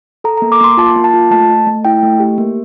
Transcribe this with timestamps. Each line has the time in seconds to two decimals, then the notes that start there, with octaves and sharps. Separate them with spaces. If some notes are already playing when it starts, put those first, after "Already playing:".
0.24 A4 A#5
0.37 A#5
0.42 A#3
0.52 D6
0.61 A#3 C6
0.77 F4 A5
0.96 A#3
1.04 A5
1.14 F4
1.31 A3 A5
1.49 A3
1.67 A3
1.85 E4 G5
2.03 A3
2.20 G4
2.38 A#3